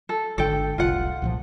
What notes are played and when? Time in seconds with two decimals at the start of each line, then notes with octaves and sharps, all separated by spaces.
0.09 A4
0.38 G#1 D3 A4 G5
0.78 F1 C2 F4 F#5
1.22 C2 A#2 F3